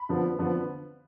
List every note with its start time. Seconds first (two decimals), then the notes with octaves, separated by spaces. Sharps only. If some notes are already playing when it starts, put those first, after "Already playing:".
Already playing: B5
0.09 D3 F3 B3
0.39 D3 F3 B3